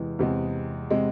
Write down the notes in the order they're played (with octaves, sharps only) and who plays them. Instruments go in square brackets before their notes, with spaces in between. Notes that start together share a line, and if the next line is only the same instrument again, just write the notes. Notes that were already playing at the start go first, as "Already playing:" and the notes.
Already playing: [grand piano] E2 C3 G#3 [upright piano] E3
[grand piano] E2 C3 G#3
C3 G#3